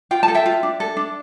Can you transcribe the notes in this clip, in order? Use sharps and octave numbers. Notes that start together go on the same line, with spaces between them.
F4 G5
A5
A4
E5 G5
F4
D4
A4
D4